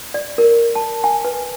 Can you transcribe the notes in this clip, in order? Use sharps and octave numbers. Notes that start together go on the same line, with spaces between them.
D5
A#4
A5
G#5
B4